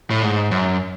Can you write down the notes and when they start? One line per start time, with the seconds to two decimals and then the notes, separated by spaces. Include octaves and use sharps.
0.11 A2
0.22 G#2
0.51 F#2